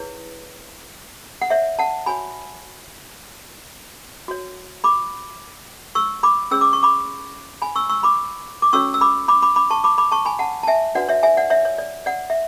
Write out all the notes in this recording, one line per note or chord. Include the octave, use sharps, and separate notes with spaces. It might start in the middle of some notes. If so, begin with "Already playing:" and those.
Already playing: E4 G#4 B4 C#5
F#5
C#5 E5
F#5 A5
F#4 C#5 G#5 B5
F#4 C#5
B5 D6
C#6 E6
B5 D6
C#4 G#4 C#5 E6
D6
C#6
B5 D6
G#5 B5
C#6 E6
C#6 E6
B5 D6
D6
C#4 F#4 A4 C#5 C#6 E6
E6
B5 D6
B5 D6
B5 D6
B5 D6
A5 C#6
B5 D6
B5 D6
A5 C#6
G#5 B5
F#5 A5
A5
E5 G#5
D4 F#4 B4 D5 F#5
C#5 E5
E5 G#5
D5 F#5
C#5 E5
C#5
D5
D5 F#5
E5